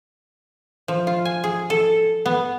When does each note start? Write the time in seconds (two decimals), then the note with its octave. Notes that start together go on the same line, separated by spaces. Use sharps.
0.88 F3
1.07 F4
1.25 G#5
1.44 G#4
1.70 A4
2.26 B3